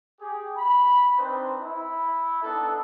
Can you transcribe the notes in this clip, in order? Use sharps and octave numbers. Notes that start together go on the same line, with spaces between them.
G4 G#4
B5
C4 D4 D#4 B4 C5
E4
B3 D4 D#4 A4